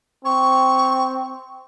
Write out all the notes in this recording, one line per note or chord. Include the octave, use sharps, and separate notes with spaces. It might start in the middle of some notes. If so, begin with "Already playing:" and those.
C4 C#6